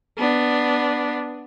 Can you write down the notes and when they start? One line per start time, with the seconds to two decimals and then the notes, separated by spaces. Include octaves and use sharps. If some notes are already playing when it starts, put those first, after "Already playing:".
0.18 B3 D4